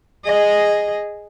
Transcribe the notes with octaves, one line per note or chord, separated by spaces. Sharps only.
G#4 D#5